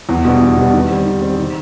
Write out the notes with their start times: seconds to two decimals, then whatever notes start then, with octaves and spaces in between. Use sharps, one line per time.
0.09 E2
0.25 B2 G3 B3 D4
0.41 E2
0.57 B2 G3 B3 D4
0.74 D#3
0.89 G3 C4
1.05 D#3
1.22 G3 C4
1.38 D#3